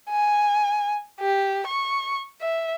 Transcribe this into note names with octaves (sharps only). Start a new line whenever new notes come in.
G#5
G4
C#6
E5